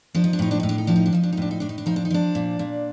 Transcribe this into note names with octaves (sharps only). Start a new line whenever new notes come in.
F3 D4
D#4
D4
A2 D#4
D4
A2 D#4
D4
D#4
F3 D4
D#4
D4
F3 D#4
D4
D#4
A2 D4
D#4
A2 D4
D#4
D4
F3 D#4
D4
D#4
F3 D4
A#2
A#2